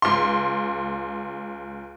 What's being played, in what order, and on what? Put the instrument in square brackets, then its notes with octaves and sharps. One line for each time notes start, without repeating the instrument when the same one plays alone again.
[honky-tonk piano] C#2 C6